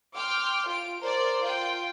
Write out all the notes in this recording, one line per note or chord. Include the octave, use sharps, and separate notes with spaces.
G5 C6 D6 F6
F4 D7
A#4 C5 D5
F4 G5